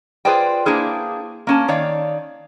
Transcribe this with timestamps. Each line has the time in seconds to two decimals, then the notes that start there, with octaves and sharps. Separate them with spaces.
0.25 F4 G#4 B4 C5 D5 G5
0.66 A#3 D4 E4 G#4 C5
1.47 A#3 C#4 A5
1.68 D#3 C#5 D5 F5